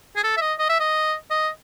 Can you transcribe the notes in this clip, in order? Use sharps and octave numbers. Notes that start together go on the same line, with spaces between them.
G#4
A4
E5
D#5
D#5
E5
D#5
D#5